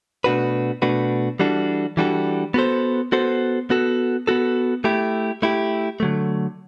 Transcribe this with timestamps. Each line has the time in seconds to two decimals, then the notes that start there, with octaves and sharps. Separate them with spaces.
0.24 B2 A3 D4 F#4 B4
0.82 B2 A3 D4 F#4 B4
1.39 E3 G3 D4 F#4 A4
1.97 E3 G3 D4 F#4 A4
2.54 B3 F#4 A4 C5
3.12 B3 F#4 A4 C5
3.70 B3 F#4 A4
4.27 B3 F#4 A4
4.84 A3 E4 G4
5.42 A3 E4 G4
6.00 D3 F#3 A3